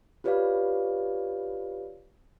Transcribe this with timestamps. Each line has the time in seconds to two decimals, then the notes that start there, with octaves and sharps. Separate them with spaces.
0.24 F4 G4 B4 C#5 D5 F5